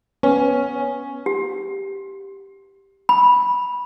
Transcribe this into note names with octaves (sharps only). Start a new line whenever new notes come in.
B3 C#4
G4
B5